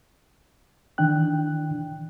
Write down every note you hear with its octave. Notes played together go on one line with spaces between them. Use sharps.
D#3 E3 D4 G5 F#6